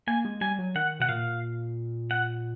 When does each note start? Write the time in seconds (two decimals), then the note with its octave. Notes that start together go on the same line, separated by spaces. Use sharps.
0.07 A#3 G#5
0.25 G#3
0.41 G3 G#5
0.58 F#3
0.75 D#3 F#5
1.00 B2 F#5
1.09 A#2 F5
2.11 F#5